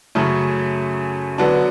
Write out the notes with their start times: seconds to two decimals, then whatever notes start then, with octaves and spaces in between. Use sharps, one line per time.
0.15 F#2 C#3 F#3 A3 C#4
1.38 D3 F#3 B3 D4